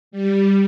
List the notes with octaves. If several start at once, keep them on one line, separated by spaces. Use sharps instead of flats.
G3